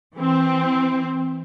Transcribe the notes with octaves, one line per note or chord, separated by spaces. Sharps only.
E3 C4